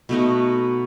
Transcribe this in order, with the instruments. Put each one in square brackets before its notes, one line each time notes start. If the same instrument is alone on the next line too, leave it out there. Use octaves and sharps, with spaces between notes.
[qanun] B2 A3 D#4 F#4